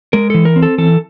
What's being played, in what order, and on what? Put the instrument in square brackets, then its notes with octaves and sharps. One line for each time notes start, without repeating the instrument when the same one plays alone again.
[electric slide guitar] G#3 A#4
E3 A4
A#4
C4
A4
E3 A4